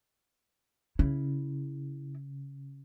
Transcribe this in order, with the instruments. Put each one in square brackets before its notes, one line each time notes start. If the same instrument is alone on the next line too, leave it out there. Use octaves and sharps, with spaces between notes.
[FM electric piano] C#3 [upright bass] E4